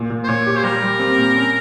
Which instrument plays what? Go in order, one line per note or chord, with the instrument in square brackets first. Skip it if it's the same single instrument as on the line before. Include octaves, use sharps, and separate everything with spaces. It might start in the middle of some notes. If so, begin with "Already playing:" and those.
Already playing: [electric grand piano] A#2
A#2
[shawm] C5
[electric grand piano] A#2 [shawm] C#5
[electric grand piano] G4
[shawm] C5
[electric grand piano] G3 [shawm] A#4
[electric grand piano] G3
C4
A#2
C#4